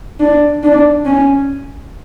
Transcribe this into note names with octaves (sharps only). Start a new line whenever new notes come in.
D4
D4
C#4